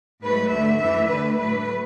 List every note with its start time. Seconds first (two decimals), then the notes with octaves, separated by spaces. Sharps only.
0.22 G#2 F#3 A3 B4
0.51 D2 D3 A3 E5
0.80 F#2 E3 A3 E5
1.08 D2 D3 A3 B4
1.38 A2 F#3 A3 B4